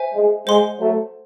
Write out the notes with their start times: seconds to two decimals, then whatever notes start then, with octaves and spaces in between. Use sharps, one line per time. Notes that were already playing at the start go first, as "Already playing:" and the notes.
Already playing: C5 E5 G#5
0.14 G#3
0.47 G#3 C5 F#5 C6
0.79 F#3 A3